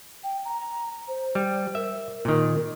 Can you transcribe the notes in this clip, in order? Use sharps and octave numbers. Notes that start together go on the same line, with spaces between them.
G5
A#5
C5
G3
A#4 E5
A#2 D#3